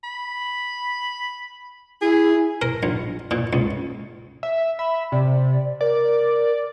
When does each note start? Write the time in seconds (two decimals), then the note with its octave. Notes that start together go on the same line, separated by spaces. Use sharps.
0.04 B5
2.01 E4 G#4
2.62 A#4
2.83 A#1
3.31 A#2
3.53 C#2
4.43 E5
4.79 E5 B5
5.12 C3 D5
5.81 A#4 D5